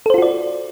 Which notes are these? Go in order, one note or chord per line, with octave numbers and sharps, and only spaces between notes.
F4 F#4 A4 C5 D5